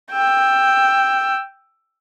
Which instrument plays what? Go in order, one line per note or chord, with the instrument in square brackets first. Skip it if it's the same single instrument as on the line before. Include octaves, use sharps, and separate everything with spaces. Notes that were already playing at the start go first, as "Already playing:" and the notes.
[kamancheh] G5 E6